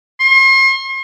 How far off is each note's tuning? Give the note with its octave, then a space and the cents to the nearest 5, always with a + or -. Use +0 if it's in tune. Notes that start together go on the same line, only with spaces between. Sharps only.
C6 +40